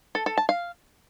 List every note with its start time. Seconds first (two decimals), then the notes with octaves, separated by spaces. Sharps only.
0.15 A4
0.26 A4
0.37 A5
0.49 F5